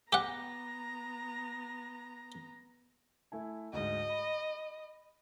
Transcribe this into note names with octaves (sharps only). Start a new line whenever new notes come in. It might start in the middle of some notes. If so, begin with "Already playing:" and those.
B3 G4 F#5 A#5
A3 E4 G#5
D2 G#2 D#5
B5